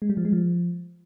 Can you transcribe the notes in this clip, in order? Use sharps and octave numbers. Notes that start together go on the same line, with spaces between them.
G#3
G3
F3
G#3
F3